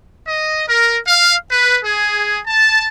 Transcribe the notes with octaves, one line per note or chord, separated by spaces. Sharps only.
D#5
A#4
F5
B4
G#4
A5